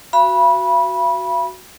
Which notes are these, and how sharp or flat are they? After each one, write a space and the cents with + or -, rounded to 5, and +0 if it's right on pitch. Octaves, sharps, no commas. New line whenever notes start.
F#4 +0 F5 -45 B5 -20